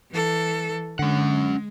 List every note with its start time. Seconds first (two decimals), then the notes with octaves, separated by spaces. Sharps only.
0.11 E3 A4
0.99 D3 G#3 C#4 F#5